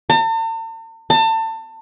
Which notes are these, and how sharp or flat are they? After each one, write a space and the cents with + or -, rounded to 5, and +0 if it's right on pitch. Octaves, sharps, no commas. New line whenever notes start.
A5 +45
A5 +30